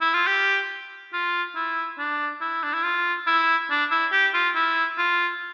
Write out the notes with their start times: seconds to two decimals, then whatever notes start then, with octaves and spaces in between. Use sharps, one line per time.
0.01 E4
0.14 F4
0.27 G4
1.13 F4
1.55 E4
1.98 D4
2.41 E4
2.63 D4
2.74 E4
2.84 F4
3.26 E4
3.70 D4
3.91 E4
4.12 G4
4.34 F4
4.55 E4
4.98 F4